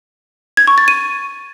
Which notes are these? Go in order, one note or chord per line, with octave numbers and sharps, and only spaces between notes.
G#6
C#6
A6
D#7